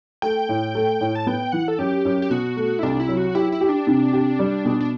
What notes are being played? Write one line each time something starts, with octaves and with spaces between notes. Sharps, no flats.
A3 G5
A2
A3
A2
A5
B3 G5
E3 F#5
A4
F#2 G4
F#2
G4
B2 F#4
A3
E4
C2 D4
E4
F#3
F#4
E4 G4
E4
G4
D4
C3
G4
G3
B2
D4